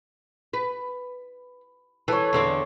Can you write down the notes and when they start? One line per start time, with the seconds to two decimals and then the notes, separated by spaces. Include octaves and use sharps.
0.53 B4
2.08 E3 A4 C#5
2.33 E2 D3 C4